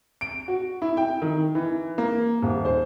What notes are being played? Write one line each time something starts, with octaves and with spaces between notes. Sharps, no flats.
D7
F#4
E4
G5
D#3
E3
A#3
D#1
C5